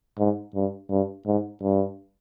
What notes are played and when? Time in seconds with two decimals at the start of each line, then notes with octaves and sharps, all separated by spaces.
0.19 G#2
0.55 G2
0.90 G2
1.26 G#2
1.63 G2